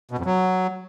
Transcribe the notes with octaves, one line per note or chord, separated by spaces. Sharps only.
B2
F2
F#3